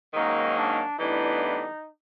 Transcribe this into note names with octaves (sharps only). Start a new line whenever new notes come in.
G#2 D#3 F#3 A#3 C#4 D#4
D4
A2 E3 G3 B3 D4 D#4